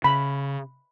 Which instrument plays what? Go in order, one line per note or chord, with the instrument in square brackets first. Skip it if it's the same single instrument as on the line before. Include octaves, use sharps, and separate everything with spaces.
[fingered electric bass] C#3 [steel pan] B5